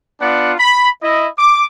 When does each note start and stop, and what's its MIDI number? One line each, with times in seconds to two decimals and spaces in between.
0.20 0.54 59
0.20 0.54 62
0.20 0.54 65
0.20 0.54 74
0.20 0.54 78
0.58 0.89 83
1.02 1.28 64
1.02 1.28 75
1.38 1.65 86